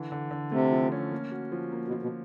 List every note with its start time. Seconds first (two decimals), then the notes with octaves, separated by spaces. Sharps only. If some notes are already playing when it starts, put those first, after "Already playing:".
Already playing: D3 E3
0.12 D3
0.31 D3
0.52 C3 A3
0.72 F3
0.92 C#4
1.12 A#3
1.31 F#4
1.52 F3
1.72 A#3
1.88 B2
1.93 F3
2.02 B2